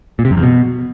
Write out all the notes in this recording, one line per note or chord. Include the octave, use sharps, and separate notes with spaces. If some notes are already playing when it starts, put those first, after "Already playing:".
A#2
C3
F#2
E2
B2